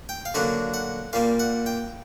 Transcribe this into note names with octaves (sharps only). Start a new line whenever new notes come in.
G5
F5
D3 F#3 A#3 F#5
F#5
A#2 G3 A#3 F5
F#5
G5